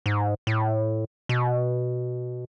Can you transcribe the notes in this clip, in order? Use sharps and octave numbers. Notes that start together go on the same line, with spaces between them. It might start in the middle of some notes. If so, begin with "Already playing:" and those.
G#2
A2
B2